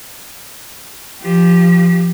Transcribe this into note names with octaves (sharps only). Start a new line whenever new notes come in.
F3 G4